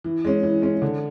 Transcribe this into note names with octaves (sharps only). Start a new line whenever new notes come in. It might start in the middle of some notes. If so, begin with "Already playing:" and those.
E3
G#3 C#4
E3
G#3 C#4
D3